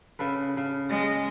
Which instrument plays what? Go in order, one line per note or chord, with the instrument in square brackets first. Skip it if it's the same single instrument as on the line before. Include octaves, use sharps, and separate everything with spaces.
[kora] C#3 A4 B4
C#3
[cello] G#3